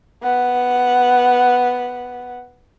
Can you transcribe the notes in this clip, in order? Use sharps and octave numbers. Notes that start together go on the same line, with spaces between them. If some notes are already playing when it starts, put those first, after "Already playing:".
B3 F#5